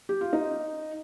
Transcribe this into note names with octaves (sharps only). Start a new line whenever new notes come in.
G4
F4
D#4